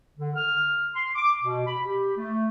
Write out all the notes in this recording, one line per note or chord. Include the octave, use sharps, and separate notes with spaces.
D3
F6
C6
D6
B2
B5
G4
A3